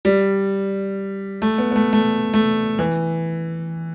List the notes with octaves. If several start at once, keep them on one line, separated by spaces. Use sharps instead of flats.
G3
A3
B3
B3
A3
A3
A3
E3